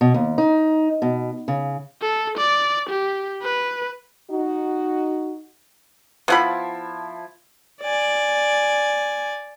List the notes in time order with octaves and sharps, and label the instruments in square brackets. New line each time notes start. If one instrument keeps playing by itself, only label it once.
[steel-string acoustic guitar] B2
D#2
D#4
B2
C#3
[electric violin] A4
D5
G4
B4
[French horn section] D#4 F#4
[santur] F3 E4 A5 [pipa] B3 F#5 B5
[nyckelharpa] D5 G#5